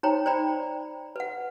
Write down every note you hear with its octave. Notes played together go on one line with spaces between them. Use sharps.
D#4 C5 C#5 G5 A#5
C5 D5 G5 A#5 B5
B4 F#5